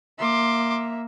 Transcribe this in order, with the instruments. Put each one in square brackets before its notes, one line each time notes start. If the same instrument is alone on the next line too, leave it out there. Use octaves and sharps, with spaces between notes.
[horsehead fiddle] A#3 E5 [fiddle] C6 D6